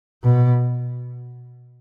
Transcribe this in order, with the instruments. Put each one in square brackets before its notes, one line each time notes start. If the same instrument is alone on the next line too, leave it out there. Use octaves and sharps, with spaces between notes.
[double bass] B2